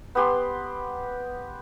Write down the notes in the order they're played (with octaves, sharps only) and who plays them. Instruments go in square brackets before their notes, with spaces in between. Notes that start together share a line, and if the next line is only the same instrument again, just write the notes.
[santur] B3 G4 C6